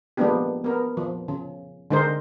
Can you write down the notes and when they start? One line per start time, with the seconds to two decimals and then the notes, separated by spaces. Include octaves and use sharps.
0.17 F3 G#3 A#3 B3 D4 G4
0.64 B3 A#4
0.97 F3
1.28 C#3
1.90 D3 G#3 D#4 A#4 C5